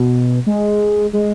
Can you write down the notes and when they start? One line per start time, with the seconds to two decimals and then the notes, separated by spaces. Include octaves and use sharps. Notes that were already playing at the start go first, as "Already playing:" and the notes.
Already playing: B2
0.47 G#3
1.13 G#3